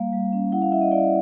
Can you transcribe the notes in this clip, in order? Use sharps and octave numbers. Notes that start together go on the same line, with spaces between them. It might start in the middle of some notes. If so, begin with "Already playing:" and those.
Already playing: G3 A#3 F5
G3
C#4
E4 F#5
F5
E4 E5
D#5
E4 D5